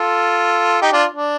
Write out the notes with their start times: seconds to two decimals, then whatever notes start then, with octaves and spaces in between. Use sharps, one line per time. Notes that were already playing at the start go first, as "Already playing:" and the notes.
Already playing: F4 A4
0.82 D#4 G4
0.92 D4 F4
1.14 D4